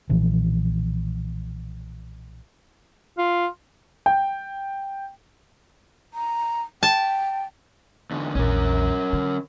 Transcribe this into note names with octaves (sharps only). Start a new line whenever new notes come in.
B1 A#2 E3 F3
F4
G5
A#5
G5 A5
E2 D3
A#1 E2 C#4 A#4
D3